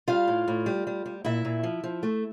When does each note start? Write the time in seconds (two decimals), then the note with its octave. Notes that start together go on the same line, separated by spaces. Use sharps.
0.08 G3 F4 F5
0.28 A2
0.48 A2
0.66 G3
0.87 G3
1.06 G3
1.25 A#2 E4 E5
1.45 A#2
1.63 F3
1.84 F3
2.03 A3